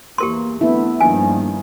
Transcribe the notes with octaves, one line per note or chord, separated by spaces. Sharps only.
E2 E3 A#3 G4 A#4 C6
D1 A3 B3 E4
A#1 G2 D#3 F3 G#5